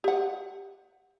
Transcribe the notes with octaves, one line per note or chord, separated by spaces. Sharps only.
G4 F#5